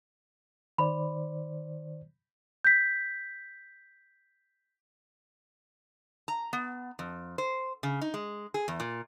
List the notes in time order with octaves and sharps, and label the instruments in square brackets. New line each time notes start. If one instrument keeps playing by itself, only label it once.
[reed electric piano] D#3 C5 D5 [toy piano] B5
[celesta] G6 B6
[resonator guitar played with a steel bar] A#5
B3
F2
C5
C#3
D#4
G#3
G#4
E2
A#2